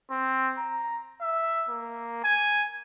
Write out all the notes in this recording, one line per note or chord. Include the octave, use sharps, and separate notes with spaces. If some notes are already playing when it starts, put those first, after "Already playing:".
C4
A#5
E5
A#3
G#5